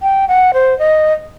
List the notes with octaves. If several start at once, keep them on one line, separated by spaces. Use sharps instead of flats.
G5
F#5
C5
D#5